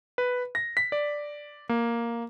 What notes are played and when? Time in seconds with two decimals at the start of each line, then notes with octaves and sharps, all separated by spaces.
0.18 B4
0.55 A#6
0.77 B6
0.92 D5
1.69 A#3